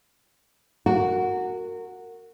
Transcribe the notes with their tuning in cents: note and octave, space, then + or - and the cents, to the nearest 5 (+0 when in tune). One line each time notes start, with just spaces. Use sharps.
F#4 -5 A#4 -25